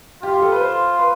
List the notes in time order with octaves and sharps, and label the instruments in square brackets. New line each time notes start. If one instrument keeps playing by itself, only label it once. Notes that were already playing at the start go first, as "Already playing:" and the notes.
[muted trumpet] F4 [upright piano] G4
[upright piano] G4
A4
B4
C5
B4